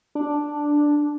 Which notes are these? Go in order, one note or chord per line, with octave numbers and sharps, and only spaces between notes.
D4